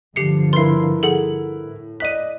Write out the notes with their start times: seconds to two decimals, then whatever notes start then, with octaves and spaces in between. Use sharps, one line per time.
0.16 G2 D3 F3 G4 C7 C#7
0.53 E4 A#4 B4 C6 C7
1.03 G#4 A4 F#5
1.65 A2
2.00 D5 D#5 F#6 B6 D#7